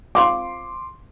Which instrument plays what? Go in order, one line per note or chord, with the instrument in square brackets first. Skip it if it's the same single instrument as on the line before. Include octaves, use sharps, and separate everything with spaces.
[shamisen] C4 F4 F5 [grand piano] C6 D6